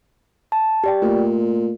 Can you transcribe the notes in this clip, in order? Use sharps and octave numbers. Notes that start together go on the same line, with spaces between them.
A5
G4 D5 G5
A#2 A3